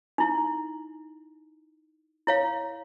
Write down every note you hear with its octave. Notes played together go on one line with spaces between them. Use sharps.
D#4 E4
E4 C#5 F5